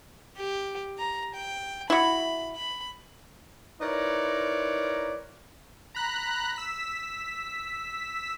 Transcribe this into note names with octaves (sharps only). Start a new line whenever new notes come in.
G4
A#5
G5
E4 F#4 B5
B5
D#4 E4 A#4 B4 C#5 D5
A#5 B5 F#6
E6 B6